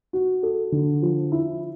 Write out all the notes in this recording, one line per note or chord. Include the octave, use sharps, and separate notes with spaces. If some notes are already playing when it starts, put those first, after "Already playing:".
F#4
A4
D3
F3
E4